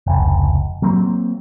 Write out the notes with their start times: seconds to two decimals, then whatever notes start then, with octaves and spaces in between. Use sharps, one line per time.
0.07 F1 C#2
0.82 F#3 A#3 C4